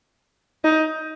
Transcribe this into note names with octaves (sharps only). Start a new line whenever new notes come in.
D#4